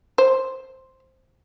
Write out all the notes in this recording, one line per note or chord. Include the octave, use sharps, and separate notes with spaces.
C5